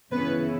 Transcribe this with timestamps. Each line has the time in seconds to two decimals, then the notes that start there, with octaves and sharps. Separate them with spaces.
0.12 C#3 E3 B3 C#4 E4 B4